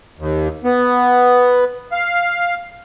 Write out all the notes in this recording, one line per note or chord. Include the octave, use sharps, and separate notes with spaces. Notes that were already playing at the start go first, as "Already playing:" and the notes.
D#2
B3
F5